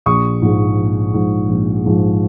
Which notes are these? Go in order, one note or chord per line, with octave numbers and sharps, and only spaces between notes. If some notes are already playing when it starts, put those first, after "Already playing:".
A#1 C#6 D#6
G#2 F3 G#3
A#1
G#2 F3 G#3
A#1
G#2 F3 G#3